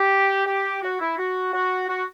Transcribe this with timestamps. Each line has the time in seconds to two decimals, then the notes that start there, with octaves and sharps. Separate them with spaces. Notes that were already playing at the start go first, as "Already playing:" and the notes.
Already playing: G4
0.47 G4
0.82 F#4
1.00 E4
1.17 F#4
1.54 F#4
1.89 F#4